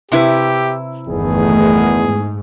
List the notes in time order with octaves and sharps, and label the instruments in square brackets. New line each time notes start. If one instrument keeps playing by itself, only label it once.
[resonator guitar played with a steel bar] C3 E4 B4 [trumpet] G4
[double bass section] G1 A3 [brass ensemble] E2 D#3 B3 [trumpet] G#4
[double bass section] G#2